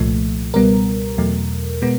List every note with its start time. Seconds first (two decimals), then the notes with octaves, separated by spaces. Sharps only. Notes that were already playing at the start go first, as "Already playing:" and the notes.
Already playing: C2 A#2 F3 A3
0.54 C#2 B2 G3 B3 A#4
1.18 E2 B2 F#3 A3
1.82 B2 G#3 B3